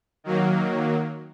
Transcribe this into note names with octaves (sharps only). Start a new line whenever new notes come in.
D#3 F#3 A#3